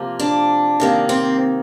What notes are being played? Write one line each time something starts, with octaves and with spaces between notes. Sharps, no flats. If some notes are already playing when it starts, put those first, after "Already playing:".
Already playing: C3 F3 A#3
D4
C3 D#3 A#3
C4